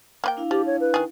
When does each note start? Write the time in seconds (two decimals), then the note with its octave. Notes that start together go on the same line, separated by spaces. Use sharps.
0.24 A#3 B4 G5
0.37 D4 E4 F5
0.51 F3 G4
0.66 C#5
0.80 B4
0.94 D#3 G#4